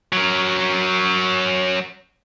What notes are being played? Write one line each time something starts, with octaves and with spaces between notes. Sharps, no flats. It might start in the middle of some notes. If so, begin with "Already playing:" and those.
F#3 A#4